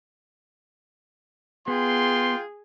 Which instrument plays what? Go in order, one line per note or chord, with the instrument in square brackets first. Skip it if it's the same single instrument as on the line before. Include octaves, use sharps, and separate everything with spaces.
[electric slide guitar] B3 [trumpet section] F4 G5 C6 [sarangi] G#4